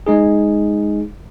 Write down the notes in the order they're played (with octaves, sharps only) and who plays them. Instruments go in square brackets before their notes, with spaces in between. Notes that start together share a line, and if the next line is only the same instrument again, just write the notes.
[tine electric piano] G#3 D#4 G#4